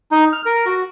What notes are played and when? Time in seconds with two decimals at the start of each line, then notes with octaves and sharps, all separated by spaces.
0.11 D#4
0.33 F6
0.45 A#4
0.65 F#4